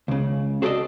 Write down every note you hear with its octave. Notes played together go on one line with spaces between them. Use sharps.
C#2 C#3
F#4 G#4 A4 B4 D5 D#5